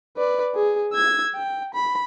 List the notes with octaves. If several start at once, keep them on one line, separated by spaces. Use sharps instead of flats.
B4 D5
G#4
E6 G#6
G5
B5